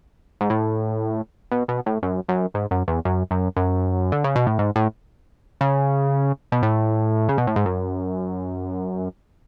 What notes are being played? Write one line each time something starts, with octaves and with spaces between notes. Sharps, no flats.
G#2
A2
B2
B2
A2
F#2
F#2
G#2
F#2
E2
F#2
F#2
F#2
D3
C#3
B2
A2
G#2
A2
C#3
B2
A2
C#3
B2
A2
G#2
F#2